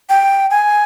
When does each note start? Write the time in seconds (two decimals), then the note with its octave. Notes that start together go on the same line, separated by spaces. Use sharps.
0.09 G5
0.51 G#5